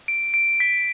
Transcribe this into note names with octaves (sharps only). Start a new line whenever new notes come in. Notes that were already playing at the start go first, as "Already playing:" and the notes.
D7
D7
B6